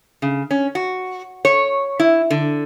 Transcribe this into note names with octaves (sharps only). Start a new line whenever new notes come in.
C#3
C#4
F#4
C#5
E4
D3